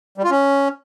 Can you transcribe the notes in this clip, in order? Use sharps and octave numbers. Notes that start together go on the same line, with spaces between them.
G3
F4
C#4